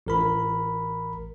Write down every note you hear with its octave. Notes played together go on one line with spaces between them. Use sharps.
A1 A#4 B5